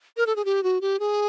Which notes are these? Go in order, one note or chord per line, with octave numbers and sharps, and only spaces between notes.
A#4
A4
G#4
G4
F#4
G4
G#4